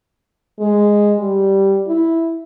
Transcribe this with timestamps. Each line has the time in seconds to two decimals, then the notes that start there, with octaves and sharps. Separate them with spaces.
0.59 G#3
1.19 G3
1.88 E4